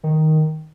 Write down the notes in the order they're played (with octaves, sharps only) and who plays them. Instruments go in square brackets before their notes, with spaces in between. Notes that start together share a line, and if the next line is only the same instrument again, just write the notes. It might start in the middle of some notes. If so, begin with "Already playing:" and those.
[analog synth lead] D#3